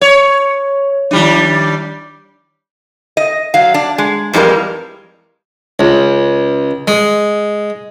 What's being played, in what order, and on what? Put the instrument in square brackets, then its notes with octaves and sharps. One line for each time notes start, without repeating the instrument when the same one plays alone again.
[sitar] C#5
D#3 G3 D4
[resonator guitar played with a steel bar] D#5
F#3 F5
D4
G#3
F2 E3 G3 G#3 A#4
[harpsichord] C#2
G#3